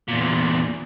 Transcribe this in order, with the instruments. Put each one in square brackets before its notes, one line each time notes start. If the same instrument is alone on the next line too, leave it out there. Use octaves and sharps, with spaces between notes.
[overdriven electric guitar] E2 A#2